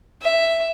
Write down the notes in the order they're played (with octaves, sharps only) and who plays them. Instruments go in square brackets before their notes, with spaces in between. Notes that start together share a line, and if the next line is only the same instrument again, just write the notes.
[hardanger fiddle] E5